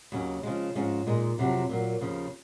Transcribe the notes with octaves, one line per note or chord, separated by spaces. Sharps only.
D#2 C#3 F#3 C#4
C#3 F3 G#3
G#2 F3 G#3 C#4
A#2 G#3 D#4
F2 C3 F#3 C4
A#2 F#3 A#3
D#2 C#3 F3